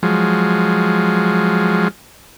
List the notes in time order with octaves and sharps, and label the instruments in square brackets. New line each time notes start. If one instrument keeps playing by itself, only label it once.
[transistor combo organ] F3 F#3 G#3